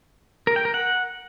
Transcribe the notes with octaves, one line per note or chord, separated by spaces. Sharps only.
A#4
G5
A#4
F#5